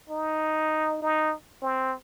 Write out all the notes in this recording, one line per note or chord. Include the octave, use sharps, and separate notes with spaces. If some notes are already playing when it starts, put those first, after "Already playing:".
D#4
D#4
C4